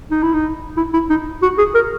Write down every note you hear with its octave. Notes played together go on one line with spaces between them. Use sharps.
D#4
E4
D#4
E4
E4
D#4
F#4
G#4
A#4